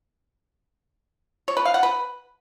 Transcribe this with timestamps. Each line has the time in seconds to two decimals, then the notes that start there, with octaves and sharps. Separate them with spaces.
1.48 C#5
1.57 B4
1.65 F5
1.74 F#5
1.83 B4